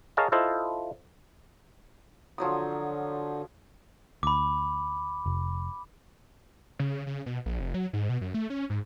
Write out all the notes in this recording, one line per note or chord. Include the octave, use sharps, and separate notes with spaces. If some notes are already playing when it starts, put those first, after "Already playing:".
G#4 A#4 C#5 D#5 F5 A5
E4 F4 A4 C5 D#5
D3 F3 F#3 D#6
D2 B5 D6
F1
C#3
C#3
B2
A#1
F1
F#3
G#2
B2
F#2
A3
C#4
G#2